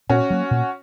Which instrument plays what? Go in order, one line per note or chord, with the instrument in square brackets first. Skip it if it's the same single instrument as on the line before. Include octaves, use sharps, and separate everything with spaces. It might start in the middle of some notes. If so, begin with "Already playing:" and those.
[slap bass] A#2 [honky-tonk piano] C#4 F#4
[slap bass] F#3 A#3
A#2